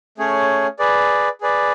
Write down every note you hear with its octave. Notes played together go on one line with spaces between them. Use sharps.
A3 C#4 G#4 C#5
G#4 B4 D5
G#4 B4 D5